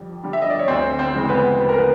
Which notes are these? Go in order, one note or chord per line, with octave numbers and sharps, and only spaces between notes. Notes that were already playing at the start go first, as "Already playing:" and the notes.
Already playing: F2 D3 G3
D3 G3
E5
D#5
D5
C#5
D2 C4 C5
C4 C5
C#3 E3 G#3
B3 B4
D2 B4
A#4
B3 B4